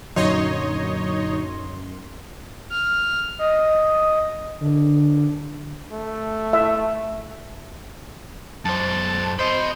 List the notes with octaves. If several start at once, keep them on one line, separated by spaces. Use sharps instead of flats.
F#2 A#2 D3 F#3 D#4 C#5 D#5 C6
F6
D#5
D3
A3
E5
F#2 C5 A5
C5 D#5 B5